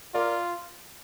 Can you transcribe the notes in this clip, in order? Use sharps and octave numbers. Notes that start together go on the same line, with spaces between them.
F4 A#4 D5